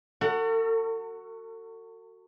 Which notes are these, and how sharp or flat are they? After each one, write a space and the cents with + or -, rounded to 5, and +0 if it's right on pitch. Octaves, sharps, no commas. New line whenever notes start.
F#4 +0 A4 +40 F#5 +0